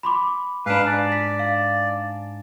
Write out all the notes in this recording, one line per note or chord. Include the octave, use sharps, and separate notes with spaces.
B5 C6 D6
G#2 D4 B4 F5
D5
B6
F5